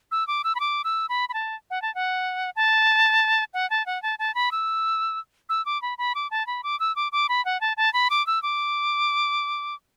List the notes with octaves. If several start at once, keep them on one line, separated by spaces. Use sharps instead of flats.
E6
D6
E6
B5
D6
E6
B5
B5
A5
F#5
A5
F#5
A5
F#5
A5
F#5
A5
A5
B5
E6
E6
D6
B5
B5
D6
A5
B5
D6
E6
D6
D6
B5
F#5
A5
A5
B5
D6
E6
D6